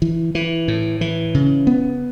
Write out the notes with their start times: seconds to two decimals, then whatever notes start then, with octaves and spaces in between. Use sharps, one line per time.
0.02 E3
0.35 E3
0.68 A2
1.01 E3
1.34 C#3
1.67 B3